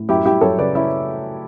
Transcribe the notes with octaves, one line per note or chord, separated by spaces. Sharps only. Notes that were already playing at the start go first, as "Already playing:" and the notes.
Already playing: A2
F#2 E4 G4
G3 E4 G4
F#2 A4 C#5
C#3 B4 D5
C#4 E4